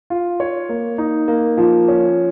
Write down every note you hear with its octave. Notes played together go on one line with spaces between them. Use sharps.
F4
C#5
A#3
D#4
A#3
F3
C#4